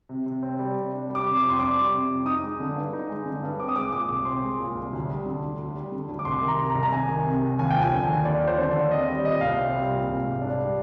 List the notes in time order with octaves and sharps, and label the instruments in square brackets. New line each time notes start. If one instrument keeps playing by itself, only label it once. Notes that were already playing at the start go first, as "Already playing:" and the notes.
[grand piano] C3
C3
C4
G3
C3
D4
G3
D6
C3
D6
F2
C6
D4 D6
G3
C3
F2
D#4 D#6
G#3
D3
G2
D#4
G#3
D3
G2
C4 D6
D#6
G#3 D6
A#2 D6
C2
C4 C6
G#3
A#2
C2
D2
G3
D3
D2
D2
G3
D3
D2
D6
C2 C6
D#3
A#5
C3
A#5
C2
A#5
C2 G#5
D#3
C3
C2
D#2 G#5
G5
F3
G#5
D3
D#2
D#2 D5
F3
C5
D3
D5
D#2
C4 D#5
G3 D5
A#2 D#5
C2 F5
C4
G3
A#2
C2
G#2
D4
G3